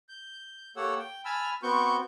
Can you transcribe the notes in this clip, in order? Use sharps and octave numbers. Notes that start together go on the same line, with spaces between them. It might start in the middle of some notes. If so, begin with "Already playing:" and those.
G6
A#3 G4 A4 C#5 F#5 E6
G5
G#5 A5 B5 E6 F6
B3 C4 F#4 C#6 G6